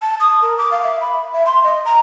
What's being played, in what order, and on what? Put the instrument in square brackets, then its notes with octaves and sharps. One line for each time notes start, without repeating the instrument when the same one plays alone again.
[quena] A5
D#6
A#4
D6
F5
E5
B5
E5
C6
D#5
A#5